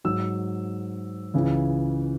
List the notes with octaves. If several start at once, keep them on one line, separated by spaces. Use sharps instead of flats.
G#2 F#3 E6
C#2 C#3 E3